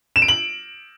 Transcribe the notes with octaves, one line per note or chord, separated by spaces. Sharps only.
E7
D7
F#7